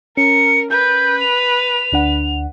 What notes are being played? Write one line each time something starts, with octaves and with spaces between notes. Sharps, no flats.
C#4 A#4 C#7
B4 G6
F7
D2 D4 F#5